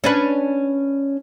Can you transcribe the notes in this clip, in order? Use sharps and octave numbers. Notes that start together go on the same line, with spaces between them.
C#4 D4 B4